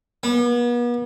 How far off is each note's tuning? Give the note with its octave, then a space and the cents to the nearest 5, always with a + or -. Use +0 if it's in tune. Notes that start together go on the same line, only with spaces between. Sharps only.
B3 -40